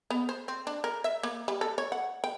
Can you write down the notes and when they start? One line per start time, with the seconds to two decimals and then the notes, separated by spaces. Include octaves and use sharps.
0.10 B3
0.29 C5
0.48 C4
0.67 D4
0.84 A#4
1.04 E5
1.23 A#3
1.48 G3
1.61 A4
1.78 C#5
1.92 F#5
2.24 G5